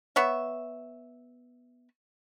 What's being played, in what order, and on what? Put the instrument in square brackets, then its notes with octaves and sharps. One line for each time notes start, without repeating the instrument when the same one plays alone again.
[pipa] B3 C#5 E5